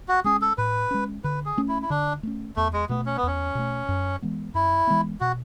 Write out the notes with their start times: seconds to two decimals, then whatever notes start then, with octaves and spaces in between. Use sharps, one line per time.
0.08 F#4
0.24 G#3 C#4 G#4
0.42 A4
0.58 A2 B4
0.91 G#3 C#4
1.24 D3 B4
1.46 G#4
1.57 A3 C#4
1.68 E4
1.82 E4
1.90 D3 D4
2.23 A3 C#4
2.56 E2 A3
2.73 G#3
2.89 B2 A3 B3
3.06 C#4
3.17 B3
3.23 E2 C#4
3.55 B2 A3
3.88 F#2
4.22 E3 G#3 B3
4.54 F#2 E4
4.87 E3 G#3 B3
5.21 B2 F#4